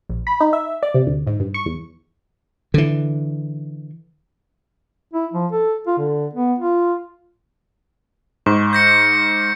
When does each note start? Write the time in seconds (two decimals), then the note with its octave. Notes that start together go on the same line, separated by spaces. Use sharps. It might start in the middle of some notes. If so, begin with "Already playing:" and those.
0.09 A#1
0.27 B5
0.40 D#4
0.53 E5
0.83 D5
0.94 C3
1.07 D2
1.27 G#2
1.40 G2
1.54 C#6
1.66 E2
2.74 D3 E3
5.13 E4
5.33 F3
5.52 A4
5.87 F4
5.98 D3
6.34 B3
6.59 F4
8.46 G#2 C#6
8.73 G6 A#6 C#7